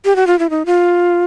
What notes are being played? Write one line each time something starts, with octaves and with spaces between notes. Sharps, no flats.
G4
F#4
F4
E4
D#4
F4